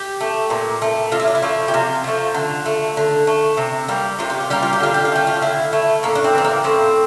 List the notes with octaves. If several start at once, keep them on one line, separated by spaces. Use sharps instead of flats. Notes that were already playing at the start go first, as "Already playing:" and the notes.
Already playing: G4
A3
A#2
A3
C3 F4
E4
D4
E4
F3 A3
G4
C3 F4
F3 A3
D3
A3
D3
A3
C3
G3 A#3
C3 F4
G4
F4
G3 A#3 G4
F4
G4
D3 F4
G4
F4
A3 G4
F4
D3 E4
A3
A2 A#3
D4
C4
E3 G3 C4
A#3
A2 C4